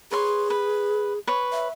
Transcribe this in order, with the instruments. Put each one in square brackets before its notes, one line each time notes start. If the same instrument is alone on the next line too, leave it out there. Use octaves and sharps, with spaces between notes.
[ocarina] G#4 [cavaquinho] B4 C#5 C6
[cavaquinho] B4
B4 C#5
[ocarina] E5